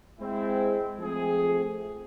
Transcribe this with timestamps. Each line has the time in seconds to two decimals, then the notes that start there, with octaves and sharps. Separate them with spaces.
0.20 G#3 C4 E4
0.99 F3 A3 C4 F4 G#4